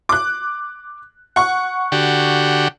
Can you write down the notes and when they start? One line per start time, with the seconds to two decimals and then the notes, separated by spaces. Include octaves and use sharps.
0.09 D6 F#6
1.36 F#5 C#6
1.92 D3 F#4 G4